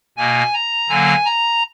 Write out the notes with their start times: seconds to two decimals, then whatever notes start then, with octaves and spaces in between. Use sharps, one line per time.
0.17 B2 A#3 G#5
0.54 A#5
0.89 D3 F#3 A#3 G#5
1.25 A#5